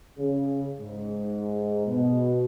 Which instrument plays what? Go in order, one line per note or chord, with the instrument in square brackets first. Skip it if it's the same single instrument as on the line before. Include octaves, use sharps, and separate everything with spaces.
[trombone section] C#3
G#2
B2